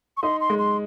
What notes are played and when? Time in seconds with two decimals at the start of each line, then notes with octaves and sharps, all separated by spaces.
0.17 C#6
0.23 D#4 C6
0.41 C6
0.50 G#3
0.59 C6